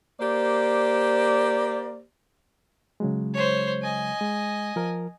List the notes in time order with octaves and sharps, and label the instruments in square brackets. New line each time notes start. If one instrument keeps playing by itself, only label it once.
[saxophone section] A#3 G4 C5 D5
[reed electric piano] C#3 F#3 G#3
[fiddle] C5 C#5
D#5 G#5
[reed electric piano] G#3
F3 A#4